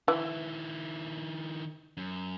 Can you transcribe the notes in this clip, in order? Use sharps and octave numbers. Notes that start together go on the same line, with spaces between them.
D#3 E3 E4
F#2